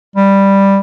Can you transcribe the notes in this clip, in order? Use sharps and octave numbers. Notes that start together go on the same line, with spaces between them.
G3